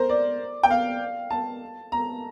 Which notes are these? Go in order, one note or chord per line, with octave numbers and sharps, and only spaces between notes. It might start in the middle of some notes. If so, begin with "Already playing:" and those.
Already playing: A#4 C5
D5
G5
F5
A5
A#5